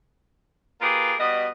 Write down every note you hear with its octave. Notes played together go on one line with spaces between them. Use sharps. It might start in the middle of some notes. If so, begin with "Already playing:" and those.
A#3 F4 G4 G#4 A#4 B4
B2 G3 B4 D#5